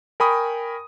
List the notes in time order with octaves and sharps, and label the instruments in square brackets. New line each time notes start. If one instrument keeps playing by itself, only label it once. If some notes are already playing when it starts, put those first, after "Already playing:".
[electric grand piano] A#4 G5 G#5 B5 C#6 D#6